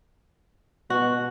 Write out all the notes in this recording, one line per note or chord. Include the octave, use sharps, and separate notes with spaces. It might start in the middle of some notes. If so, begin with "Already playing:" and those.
B2 F#4